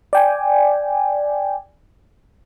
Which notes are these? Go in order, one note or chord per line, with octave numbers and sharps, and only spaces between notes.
D5 G5 G#5